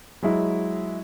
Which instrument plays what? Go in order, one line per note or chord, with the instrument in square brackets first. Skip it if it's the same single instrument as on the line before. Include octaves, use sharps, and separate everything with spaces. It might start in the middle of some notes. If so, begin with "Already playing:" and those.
[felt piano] F#3 G#3 E4